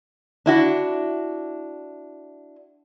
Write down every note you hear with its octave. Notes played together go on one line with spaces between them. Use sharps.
D4 E4 F#4